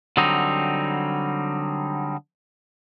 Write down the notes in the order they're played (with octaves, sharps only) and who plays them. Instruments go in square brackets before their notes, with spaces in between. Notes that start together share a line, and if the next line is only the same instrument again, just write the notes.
[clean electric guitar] D3 F#3 G3 C4 D#4